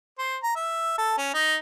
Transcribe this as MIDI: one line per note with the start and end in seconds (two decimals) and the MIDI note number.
0.19 0.36 72
0.43 0.54 82
0.56 0.93 76
0.98 1.14 69
1.17 1.32 61
1.34 1.56 63